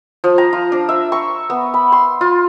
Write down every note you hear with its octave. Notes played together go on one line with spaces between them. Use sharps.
F3
A#5
F4
D4
E5
C#6
B3
B5
C6
F4